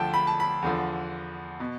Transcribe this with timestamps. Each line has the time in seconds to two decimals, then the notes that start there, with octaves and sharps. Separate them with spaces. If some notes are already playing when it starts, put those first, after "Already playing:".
Already playing: D2 D3 F3 G5 A5
0.14 B5
0.27 A5
0.40 B5
0.62 E2 D3 F3
1.60 B2